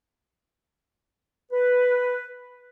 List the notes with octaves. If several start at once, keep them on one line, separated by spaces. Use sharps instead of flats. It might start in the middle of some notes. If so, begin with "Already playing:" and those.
B4